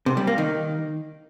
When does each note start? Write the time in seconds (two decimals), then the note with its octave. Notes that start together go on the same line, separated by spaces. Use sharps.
0.06 C3
0.17 G3
0.27 A#3
0.38 D#3